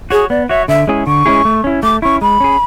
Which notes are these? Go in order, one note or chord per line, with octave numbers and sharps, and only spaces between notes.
F#4 G#4 C#5
B3 D5
F#4 C#5 E5
D3 E5
G#3 C#4 E4 G#4
D3 C#6
G#3 C#4 E4 G#4
A3
C#4 E4
A3 D6
C#4 E4 C#6
G#3 B5
C#4 G#4